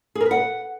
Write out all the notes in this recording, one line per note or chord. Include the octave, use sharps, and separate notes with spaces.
G#4
A#4
B4
F#5